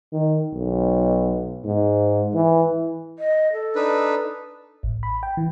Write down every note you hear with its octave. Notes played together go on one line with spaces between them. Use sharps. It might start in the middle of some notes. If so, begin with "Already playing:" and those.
D#3
B1
G#2
E3
D#5
A4
D4 D#4 B4
A1
B5
G5
E3